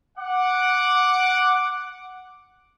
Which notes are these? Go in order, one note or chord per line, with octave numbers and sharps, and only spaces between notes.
F#5 D6